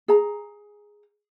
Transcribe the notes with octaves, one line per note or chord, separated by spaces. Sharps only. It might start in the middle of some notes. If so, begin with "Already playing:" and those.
G#4 A#5